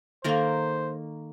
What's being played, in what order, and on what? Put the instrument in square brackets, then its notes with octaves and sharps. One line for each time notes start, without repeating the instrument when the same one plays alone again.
[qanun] D#3 A#3 A#4 [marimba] A4 F5 [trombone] C5